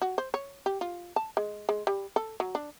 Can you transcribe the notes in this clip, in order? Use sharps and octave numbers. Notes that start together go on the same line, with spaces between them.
F#4
C5
C#5
G4
F4
A5
G#3
G#3
G3
A4
F#3
D4